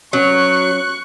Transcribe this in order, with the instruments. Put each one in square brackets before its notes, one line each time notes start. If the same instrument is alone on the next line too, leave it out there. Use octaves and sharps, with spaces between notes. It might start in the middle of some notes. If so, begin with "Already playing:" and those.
[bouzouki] F#3 [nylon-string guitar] B3 C#4 C#5 [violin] C#6 [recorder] F#6